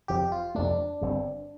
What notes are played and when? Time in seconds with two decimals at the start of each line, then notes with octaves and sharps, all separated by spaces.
0.08 F1 F2 F3 G4
0.32 F4
0.55 F2 C3 A3 D4
1.01 G1 G2 G3 C4